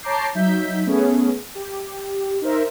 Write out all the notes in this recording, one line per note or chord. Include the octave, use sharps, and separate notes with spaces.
C#5 A5 A#5 D6 G6 C7
F#3 D#4 E5 G6 B6
A3 B3 C#4 G#4
G4
D#4 A#4 C5 E5